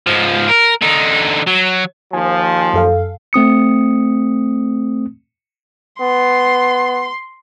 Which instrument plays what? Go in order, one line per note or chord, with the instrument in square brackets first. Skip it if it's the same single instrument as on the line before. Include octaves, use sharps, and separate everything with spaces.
[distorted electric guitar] G#2 F3
A#4
D3 D#4
F#3
[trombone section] D#2 F3 [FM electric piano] G#5
[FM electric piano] F#2 A4 F5
[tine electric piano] A3 C4 D#6 C#7
[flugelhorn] B3 [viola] C6